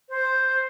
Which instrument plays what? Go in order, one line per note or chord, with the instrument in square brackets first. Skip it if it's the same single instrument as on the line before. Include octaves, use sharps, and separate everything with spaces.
[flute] C5